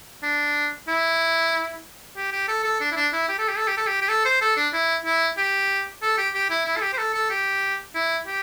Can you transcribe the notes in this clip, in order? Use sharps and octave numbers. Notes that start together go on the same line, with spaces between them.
D4
E4
G4
G4
A4
A4
D4
E4
D4
E4
G4
A4
G4
A4
G4
A4
G4
G4
A4
C5
A4
D4
E4
E4
G4
A4
G4
G4
E4
E4
A4
G4
C5
A4
A4
G4
E4
G4